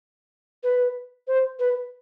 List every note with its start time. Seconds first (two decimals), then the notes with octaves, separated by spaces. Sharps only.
0.63 B4
1.28 C5
1.59 B4